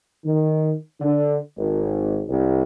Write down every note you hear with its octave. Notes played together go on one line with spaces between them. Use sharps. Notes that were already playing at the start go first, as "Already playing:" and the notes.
D#3
D3
G#1
C2